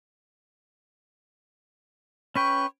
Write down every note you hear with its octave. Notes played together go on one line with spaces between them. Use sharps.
C#4 B4 G5 C#6